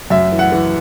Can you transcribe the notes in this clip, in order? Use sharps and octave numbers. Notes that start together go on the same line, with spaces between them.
F#2 E5
E3
F#5
E3